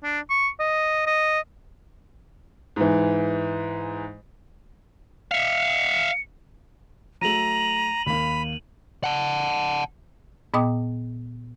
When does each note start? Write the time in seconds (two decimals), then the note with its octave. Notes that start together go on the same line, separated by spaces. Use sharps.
0.03 D4
0.30 C#6
0.60 D#5
1.07 D#5
2.76 G#2 E3
5.31 E5 F5 C#7
7.21 F#3 A3 A#5 D#7 F7 F#7
8.06 D#2 A#3 B5
9.04 F#5 A5
10.54 A#2 B3 D#5 G5 D6 D#6